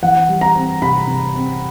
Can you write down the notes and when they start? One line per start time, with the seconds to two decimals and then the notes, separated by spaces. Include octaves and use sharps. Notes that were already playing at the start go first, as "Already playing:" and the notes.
0.03 E3 F#5
0.29 G3
0.41 A#5
0.56 C4
0.82 C3 B5
1.07 C3
1.35 C4